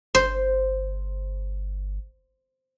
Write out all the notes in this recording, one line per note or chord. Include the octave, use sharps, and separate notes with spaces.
G1 C5